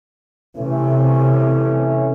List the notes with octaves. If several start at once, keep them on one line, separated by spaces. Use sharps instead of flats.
C3 E3 A3 C#4